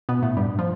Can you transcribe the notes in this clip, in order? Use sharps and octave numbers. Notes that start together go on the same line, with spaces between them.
B2 B3
A2 A3
G2 G3
F3